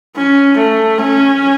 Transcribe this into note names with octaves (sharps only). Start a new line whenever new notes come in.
C#4
A3
C#4